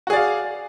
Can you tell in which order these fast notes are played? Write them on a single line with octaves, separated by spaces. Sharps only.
F#4 G#4 D5 F5